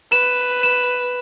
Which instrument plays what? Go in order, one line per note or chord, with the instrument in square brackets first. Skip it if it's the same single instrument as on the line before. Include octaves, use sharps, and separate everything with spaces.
[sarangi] B4 [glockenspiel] E7
[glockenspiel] E7